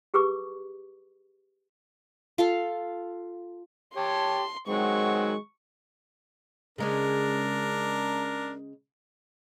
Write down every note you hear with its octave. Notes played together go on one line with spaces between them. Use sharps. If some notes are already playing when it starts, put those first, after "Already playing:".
G4 G#4 B4 C#6 D6
F4 A4 F5
G4 C#5 A5 C6
D#3 F#3 G#3 C4 F#5 C#6
C#3 G#3 C#4 D4 A#4